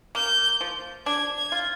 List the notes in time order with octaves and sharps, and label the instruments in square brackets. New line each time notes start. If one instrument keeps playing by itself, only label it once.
[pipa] A#3 [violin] G6
[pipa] F3
[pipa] D4 [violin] G#6
[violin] G#6
[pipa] F4